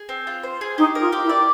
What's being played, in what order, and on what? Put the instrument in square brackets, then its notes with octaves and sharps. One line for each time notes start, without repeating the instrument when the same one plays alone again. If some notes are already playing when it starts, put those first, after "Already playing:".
Already playing: [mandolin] G#4
C4
F4
C5
G#4
[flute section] D#4 [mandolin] G4
[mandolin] A#4
[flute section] F4
[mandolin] G4
[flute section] E4
[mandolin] D5